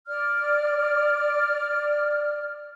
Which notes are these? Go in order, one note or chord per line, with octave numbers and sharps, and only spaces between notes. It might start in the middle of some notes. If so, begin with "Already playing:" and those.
D5 F6